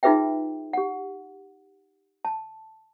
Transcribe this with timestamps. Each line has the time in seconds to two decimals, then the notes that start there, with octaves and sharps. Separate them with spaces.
0.03 D#4 F4 G#4 B4 E5 G5
0.73 G4 F#5
2.25 A5